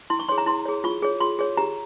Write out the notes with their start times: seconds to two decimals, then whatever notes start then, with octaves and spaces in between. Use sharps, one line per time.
0.10 E4 C6
0.19 C#6
0.29 G#4 C#5 C6
0.38 A#5
0.46 E4 C6
0.66 G#4 C#5
0.84 F4 C#6
1.02 G#4 C#5
1.21 F4 C6
1.39 G#4 C#5
1.57 G4 A#5